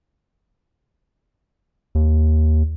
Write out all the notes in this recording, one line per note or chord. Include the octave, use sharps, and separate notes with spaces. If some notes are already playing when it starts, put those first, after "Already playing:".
D#2